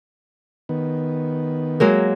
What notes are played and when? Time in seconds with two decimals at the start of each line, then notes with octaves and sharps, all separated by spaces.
0.69 D#3 B3
1.80 F#3 G#3 A#3